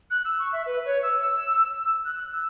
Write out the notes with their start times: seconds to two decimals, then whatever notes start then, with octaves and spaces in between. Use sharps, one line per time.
0.11 F#6
0.25 E6
0.39 C#6
0.53 E5
0.66 B4
0.85 C#5
1.03 E6
1.22 E6
1.77 E6
2.05 F#6
2.32 E6